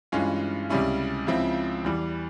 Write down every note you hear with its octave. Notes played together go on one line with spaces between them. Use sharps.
G2 E3 G#3 C#4 F4
C#2 C3 G3 C#4 E4
C#2 C#3 F3 C4 E4
E2 E3 G3